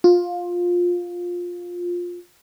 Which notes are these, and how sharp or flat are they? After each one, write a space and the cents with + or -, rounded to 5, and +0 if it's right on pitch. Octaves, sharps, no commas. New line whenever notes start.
F4 +15